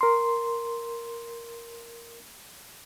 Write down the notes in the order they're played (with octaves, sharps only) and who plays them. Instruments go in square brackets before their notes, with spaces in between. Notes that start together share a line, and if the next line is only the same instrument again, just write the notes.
[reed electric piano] A#4 C6